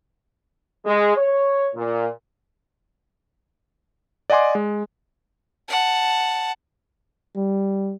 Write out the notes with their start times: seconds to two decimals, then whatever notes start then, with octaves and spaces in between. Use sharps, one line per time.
0.85 G#3
1.16 C#5
1.75 A#2
4.30 D5 D#5 F#5 G#5 C6 D6
4.55 G#3
5.68 F#5 A5
7.36 G3